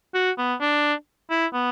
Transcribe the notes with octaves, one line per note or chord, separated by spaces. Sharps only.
F#4
B3
D4
E4
B3